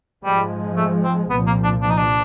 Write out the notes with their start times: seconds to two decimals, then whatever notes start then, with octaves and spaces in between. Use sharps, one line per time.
0.24 G#2 F3 G3 G#3
0.77 A3
1.04 C4
1.29 C2 A#2 F3 B3
1.46 A#3
1.64 D4
1.82 D4
1.90 D#4
1.97 D4